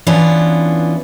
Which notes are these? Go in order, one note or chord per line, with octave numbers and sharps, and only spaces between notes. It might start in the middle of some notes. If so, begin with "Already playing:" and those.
E3 B3 C#4 D4 E4 F4